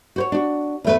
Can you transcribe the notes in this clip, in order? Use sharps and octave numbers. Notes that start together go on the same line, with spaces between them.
F#4 C5 C#5
D4 F#4
E2 A3 B4